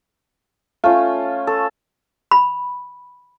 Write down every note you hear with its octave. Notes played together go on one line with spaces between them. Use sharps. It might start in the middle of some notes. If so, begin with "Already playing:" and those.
A3 C#4 F4
A4
B5